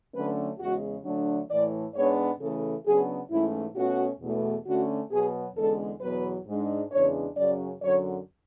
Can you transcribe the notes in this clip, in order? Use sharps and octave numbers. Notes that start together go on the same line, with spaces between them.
D3 F#3 A3 C#4 B4
E2 C#3 G#3 F#4
D3 F#3 A3 D4
A2 E3 A3 D5
G#2 G#3 B3 D4 C#5
C#3 E3 A3 A4
C#3 F#3 B3 D4 G#4
G#2 E3 A3 C#4 E4
B2 A3 C#4 F#4
E2 B2 A3
D3 A3 C#4 F#4
B2 F#3 B3 G#4
E2 D3 G#3 C#4 A4
E2 B2 F#3 B4
G#2 G#3 D4
E2 C#3 G#3 D4 C#5
F#2 C#3 F#3 C#4 D5
F#2 D3 F#3 C#5